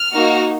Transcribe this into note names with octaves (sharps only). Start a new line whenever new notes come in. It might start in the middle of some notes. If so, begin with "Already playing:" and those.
Already playing: F6
A#3 D#4 F#4